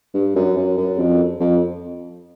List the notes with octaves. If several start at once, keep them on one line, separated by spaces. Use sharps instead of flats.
G2
F#2
F#2
F#2
F2
F2